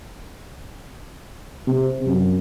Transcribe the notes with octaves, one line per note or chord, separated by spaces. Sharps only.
C3
F#2